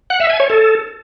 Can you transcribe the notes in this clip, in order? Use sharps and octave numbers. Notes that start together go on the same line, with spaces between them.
F#5
E5
G#5
C#5
A4